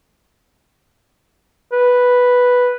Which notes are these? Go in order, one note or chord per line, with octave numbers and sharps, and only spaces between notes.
B4